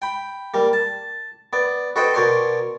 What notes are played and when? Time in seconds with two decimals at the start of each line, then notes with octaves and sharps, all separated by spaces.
0.02 G5 B5
0.54 G3 A#3
0.73 A5
1.53 B3 D5
1.96 F#4 A4 B4 C5 D#5 G5
2.14 B2 A#4 C#5 D5 C6